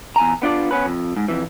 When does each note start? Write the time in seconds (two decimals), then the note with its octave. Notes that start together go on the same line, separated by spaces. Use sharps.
0.16 E2 G#5 A#5
0.42 B3 D4 F4 D5
0.71 B3 C#4 B4
0.85 F2
1.16 G#2
1.28 F2 E3